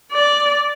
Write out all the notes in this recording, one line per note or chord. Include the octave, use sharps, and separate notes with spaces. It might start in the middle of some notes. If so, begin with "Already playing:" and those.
D5